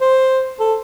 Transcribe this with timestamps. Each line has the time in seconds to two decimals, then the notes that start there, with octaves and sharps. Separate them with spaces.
0.01 C5
0.60 A4